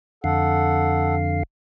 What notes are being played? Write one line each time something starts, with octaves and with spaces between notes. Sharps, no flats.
F2 D3 A4 F5 F#5